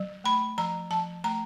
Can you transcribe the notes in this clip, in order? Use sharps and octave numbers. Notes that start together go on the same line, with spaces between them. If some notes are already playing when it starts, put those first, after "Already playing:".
Already playing: F#3
A3 B5
F3 A#5
F3 A5
A3 A#5